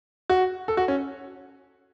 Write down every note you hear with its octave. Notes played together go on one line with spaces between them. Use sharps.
F#4
A4
F#4
C#4